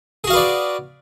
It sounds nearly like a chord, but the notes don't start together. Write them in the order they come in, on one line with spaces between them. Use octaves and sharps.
G#4 F#4 F5 B4 D5